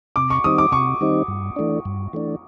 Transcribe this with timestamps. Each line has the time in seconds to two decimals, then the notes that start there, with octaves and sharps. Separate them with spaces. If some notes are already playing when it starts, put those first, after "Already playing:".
0.16 C3 D6
0.30 C#6
0.44 D#3 G3 C4 D#4 D#6
0.58 D6
0.72 C3 C#6
1.01 D#3 G3 C4 D#4
1.28 G2
1.56 E3 A3 D4
1.85 G2
2.13 E3 A3 D4